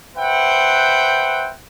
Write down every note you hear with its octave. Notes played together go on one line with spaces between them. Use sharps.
B4 C5 E5 F#5 G5